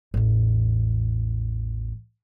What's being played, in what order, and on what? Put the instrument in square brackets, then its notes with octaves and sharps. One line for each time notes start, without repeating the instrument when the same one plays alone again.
[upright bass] A1 E2